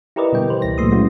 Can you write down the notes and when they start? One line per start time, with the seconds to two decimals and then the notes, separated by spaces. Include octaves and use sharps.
0.16 E4 G4 A#4 B4 D5 D#5
0.33 B2 D3 G3 G5
0.50 E3 B4 C5
0.62 C#2 E4 A#6
0.78 A#2 F#3 A3 A#3 C6 D#6
0.92 G#3 C#4 E4 F#4